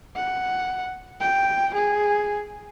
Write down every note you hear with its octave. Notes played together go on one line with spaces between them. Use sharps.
F#5
G5
G#4